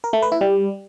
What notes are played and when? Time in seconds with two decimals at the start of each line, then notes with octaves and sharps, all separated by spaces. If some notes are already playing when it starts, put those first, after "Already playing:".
0.04 A#4
0.13 A3
0.22 B4
0.32 E4
0.41 G3